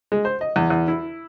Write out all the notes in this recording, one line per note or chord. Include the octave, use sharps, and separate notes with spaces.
G#3
C5
D#5
E2
E2
E4